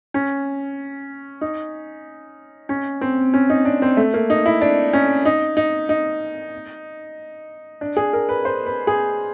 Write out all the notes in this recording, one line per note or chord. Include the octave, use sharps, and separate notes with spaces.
C#4
D#4
C#4
C4
C#4
D#4
D4
C4
A3
A#3
D#4
E4
D4
C#4
D#4
D#4
D#4
D4
G#4
A#4
B4
C5
B4
G#4